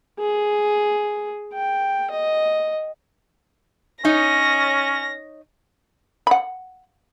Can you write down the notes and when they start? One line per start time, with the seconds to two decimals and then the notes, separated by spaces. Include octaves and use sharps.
0.20 G#4
1.54 G5
2.10 D#5
4.05 C#4 D#4 C#5 D#5 A#6
6.27 F#5 B5